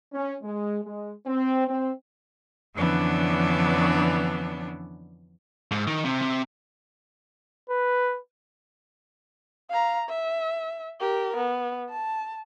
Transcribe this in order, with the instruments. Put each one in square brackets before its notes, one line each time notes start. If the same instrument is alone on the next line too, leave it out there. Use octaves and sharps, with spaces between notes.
[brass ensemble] C#4
G#3
G#3
C4
C4
[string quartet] F2 D3 E3 B3 C#4 D4
[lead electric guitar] G#2
D#3
C3
C3
[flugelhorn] B4
[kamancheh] F5 A#5
E5
G4 A#4
B3
A5